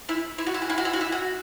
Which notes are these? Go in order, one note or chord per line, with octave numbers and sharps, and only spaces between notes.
E4
E4
F#4
E4
F#4
E4
F#4
E4
F#4
E4
F#4